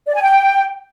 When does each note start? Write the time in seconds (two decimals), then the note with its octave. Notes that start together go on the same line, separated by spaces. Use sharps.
0.07 D5
0.15 G#5
0.22 G5